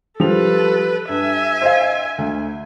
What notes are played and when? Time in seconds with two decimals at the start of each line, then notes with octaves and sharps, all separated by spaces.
0.20 F3 G3 A4 B4 F7
1.09 G2 E5 G#5
1.62 C5 D#5 F5
2.18 D2